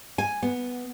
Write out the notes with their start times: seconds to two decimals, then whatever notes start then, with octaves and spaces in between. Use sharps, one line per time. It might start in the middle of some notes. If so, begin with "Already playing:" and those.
0.18 G#5
0.43 B3